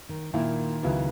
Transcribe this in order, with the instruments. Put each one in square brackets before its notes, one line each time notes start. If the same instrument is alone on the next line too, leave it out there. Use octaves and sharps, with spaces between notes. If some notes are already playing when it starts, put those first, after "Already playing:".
[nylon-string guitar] D#3
[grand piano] A#2 A#3 E4 [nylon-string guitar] D#3
[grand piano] C#2 C#3 F#3 B3 E4